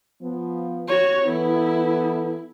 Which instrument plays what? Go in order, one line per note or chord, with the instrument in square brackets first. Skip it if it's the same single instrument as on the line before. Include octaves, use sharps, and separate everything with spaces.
[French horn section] F3 B3
[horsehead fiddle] F#4 C#5
[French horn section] E3 B3 A4 [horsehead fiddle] E4